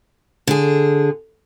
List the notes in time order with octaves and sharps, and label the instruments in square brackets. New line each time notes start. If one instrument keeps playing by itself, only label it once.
[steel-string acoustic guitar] D3 G#4